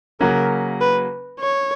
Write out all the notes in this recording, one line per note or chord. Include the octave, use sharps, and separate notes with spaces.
C#3 F#3 A#3 C#4 F#4 A#4
B4
C#5